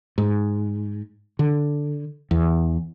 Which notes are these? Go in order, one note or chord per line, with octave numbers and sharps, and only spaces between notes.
G#2
D3
E2